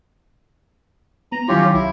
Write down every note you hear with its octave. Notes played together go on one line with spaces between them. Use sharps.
B3 A#5
D#3 F#3 C#4 E4 F4 G4
C2 E4